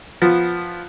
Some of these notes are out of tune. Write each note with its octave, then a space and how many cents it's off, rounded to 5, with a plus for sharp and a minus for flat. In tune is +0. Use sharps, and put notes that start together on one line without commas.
F3 +0 B3 +0